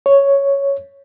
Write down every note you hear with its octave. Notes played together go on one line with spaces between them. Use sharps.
C#5